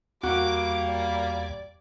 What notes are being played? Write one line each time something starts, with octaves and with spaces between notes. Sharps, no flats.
E2 G3 A#3 F#4 D6 G#6
D5